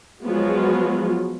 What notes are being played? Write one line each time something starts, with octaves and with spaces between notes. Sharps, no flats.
F3 F#3 G#3 B3 F4 F#4